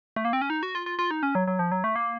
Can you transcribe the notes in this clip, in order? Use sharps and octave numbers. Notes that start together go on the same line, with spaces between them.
A3
A#3
C4
C#4
D#4
F#4
F4
F4
F4
D#4
C#4
F#3
F#3
F3
F#3
A3
A#3